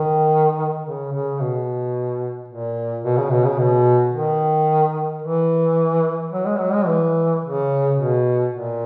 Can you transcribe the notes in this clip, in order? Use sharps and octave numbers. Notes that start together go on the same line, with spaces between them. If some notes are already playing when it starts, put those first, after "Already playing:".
Already playing: D#3
C#3
C#3
B2
A#2
B2
C#3
B2
C#3
B2
D#3
E3
F#3
G#3
F#3
G#3
E3
C#3
B2
A#2